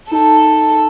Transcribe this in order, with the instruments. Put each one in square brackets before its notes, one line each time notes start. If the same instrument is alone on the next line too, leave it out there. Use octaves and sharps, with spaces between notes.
[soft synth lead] D#4 [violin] A4